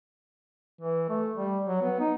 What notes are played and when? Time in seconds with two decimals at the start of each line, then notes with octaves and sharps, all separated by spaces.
0.81 E3
1.09 A3
1.36 G3
1.67 F#3
1.82 B3
2.00 D#4